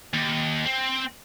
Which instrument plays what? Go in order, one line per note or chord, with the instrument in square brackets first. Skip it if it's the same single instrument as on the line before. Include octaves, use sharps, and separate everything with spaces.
[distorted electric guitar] D#2
C4